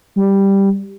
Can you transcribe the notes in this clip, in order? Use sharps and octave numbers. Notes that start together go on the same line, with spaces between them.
G3